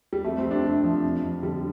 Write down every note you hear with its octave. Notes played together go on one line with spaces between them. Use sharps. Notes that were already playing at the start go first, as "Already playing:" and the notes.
G3
F2 A3
C4
F2
D4
C3
F3
F2
F2
D3 G3